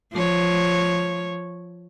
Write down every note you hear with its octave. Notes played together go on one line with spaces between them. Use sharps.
F3 C#5